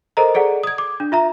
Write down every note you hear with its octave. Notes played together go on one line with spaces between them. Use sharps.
A4 A#4 C5 D#5 A#5
G#4 A4 D5 F#5
D#6 G#6
D6
D4
F4 E5 A#5